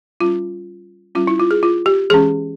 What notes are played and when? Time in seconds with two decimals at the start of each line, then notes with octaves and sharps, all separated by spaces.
0.21 G3 C#4 F4
1.15 G3 C#4 F4
1.27 E4
1.40 F4
1.51 G#4
1.63 F4
1.86 G4
2.10 E3 G#3 C#4 G#4